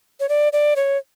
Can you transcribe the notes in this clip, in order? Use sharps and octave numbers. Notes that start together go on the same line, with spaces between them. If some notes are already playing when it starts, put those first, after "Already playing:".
C#5
D5
D5
C#5